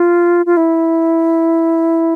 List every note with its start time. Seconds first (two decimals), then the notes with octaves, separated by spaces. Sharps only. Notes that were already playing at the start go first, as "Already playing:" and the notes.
Already playing: F4
0.46 F4
0.57 E4